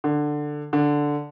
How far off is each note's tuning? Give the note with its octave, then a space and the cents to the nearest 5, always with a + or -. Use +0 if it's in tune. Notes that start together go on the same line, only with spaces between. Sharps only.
D3 +10
D3 -5